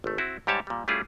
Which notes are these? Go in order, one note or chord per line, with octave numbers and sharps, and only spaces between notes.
G#1 A3
C4 E4 F#4
G#2 G3 G4 C#5 A5
A#2 G3
G3 A3 C#4 E4 F4 G#4